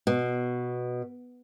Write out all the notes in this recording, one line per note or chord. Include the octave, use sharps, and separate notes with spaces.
B2